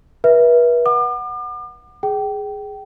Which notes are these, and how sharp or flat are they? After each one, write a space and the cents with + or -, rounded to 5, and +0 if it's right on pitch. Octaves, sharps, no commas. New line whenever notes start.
B4 -35 E5 +0
F#5 +0 D6 +40
G#4 +0 G5 -20